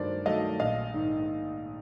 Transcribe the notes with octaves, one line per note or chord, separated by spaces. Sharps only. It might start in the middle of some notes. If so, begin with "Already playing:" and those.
Already playing: G2 D#3 F#3 A3 A#4 C5 D5
D#3 F#3 A3 D#5 F5
A#1 D#5 F5
G#2 D#3